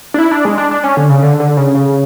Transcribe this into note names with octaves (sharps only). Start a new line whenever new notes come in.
D4
E4
D4
G#3
D4
D4
C#4
D3
C#3
D3
D3
C#3
C#3